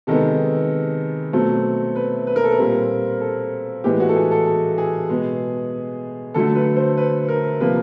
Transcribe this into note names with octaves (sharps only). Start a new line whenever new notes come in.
C3 D#3 G#3 B3 A4
B2 F#3 A3 C4
B4
B4
A#4
A4
A#4
A#2 G3 C4
A4
A2 E3 G#3 B3 G4
F#4
A4
G#4
A4
A4
G#4
B2 G#3 B3
D3 F#3 A3 A4
B4
C5
B4
A#4
C3 F3 A#3 B4